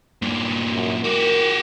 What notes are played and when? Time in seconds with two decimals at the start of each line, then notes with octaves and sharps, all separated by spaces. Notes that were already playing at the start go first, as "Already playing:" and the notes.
0.22 G2 A#2
0.74 F#2
1.04 F#4 G4 A#4